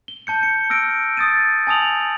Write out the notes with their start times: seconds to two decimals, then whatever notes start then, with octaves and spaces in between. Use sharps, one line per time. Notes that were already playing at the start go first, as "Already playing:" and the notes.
0.08 G7
0.27 A5 G6 C#7
0.43 C#7
0.70 E6 F6 A#6 D7
1.17 D#6 A6 D#7
1.67 G#5 A5 D#6 F7 F#7